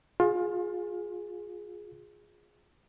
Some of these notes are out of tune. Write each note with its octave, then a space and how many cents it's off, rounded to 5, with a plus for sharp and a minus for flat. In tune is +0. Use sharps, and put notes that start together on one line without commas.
F4 +30 G#4 +0